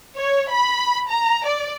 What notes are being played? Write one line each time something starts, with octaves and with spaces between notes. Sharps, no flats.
C#5
B5
A#5
D5